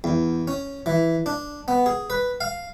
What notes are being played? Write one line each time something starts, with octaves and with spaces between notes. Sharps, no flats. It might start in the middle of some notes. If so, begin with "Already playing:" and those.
E2
C#4
E3
D4
B3
G#4
B4
F5